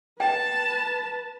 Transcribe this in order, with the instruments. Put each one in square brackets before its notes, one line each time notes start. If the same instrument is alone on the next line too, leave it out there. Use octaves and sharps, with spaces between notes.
[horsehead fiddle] B4 [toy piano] G5 [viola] A5